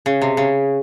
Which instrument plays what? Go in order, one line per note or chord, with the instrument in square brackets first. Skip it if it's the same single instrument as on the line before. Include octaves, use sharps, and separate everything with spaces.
[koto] C#3
C3
C#3